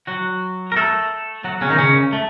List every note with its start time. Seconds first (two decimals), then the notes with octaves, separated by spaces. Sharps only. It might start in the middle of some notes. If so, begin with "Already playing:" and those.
0.07 F#3 F#4
0.72 A#4
0.76 A3 A4
1.44 F#3 F#4
1.61 C#3 C#4
1.70 D#3 D#4
1.78 C#3 C#4
2.13 A3